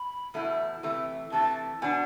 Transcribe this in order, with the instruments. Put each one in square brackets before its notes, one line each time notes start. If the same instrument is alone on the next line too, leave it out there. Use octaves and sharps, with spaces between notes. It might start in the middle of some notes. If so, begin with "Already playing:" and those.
Already playing: [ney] B5
[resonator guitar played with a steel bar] E2 B2 A3 E4
C3 E3 A3
[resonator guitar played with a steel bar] C3 E3 A3 [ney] A5
[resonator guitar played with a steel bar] B2 B3 D4 [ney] G#5